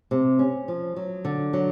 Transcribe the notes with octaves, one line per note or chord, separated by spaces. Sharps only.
C3
C#4
F3
F#3
D3
F#3